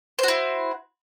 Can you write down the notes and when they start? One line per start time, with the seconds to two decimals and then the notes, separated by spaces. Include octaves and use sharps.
0.19 C5
0.23 F#4
0.28 E4